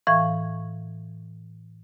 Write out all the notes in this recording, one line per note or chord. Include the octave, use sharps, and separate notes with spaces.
A2 E3 F5 C#6 G#6